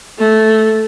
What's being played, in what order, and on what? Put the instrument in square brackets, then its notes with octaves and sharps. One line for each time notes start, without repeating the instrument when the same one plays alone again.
[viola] A3